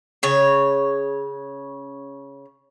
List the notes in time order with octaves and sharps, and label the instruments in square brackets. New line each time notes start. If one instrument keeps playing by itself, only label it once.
[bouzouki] C#3 C#5